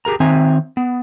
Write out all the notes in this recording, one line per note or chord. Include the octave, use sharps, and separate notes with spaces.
G4 G#4 A#4 A#5
D#3 C4 E5 G#5 A#5
B3